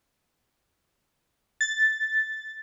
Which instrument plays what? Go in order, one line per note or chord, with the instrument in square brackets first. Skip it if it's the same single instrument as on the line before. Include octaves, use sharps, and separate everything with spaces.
[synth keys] A6